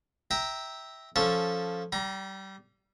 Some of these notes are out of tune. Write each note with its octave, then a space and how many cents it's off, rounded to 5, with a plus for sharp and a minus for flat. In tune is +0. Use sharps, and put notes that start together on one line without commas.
E5 -15 G5 +0 A#5 +0
F3 +5 C#4 +0 A4 +0
G3 -25 A#5 +20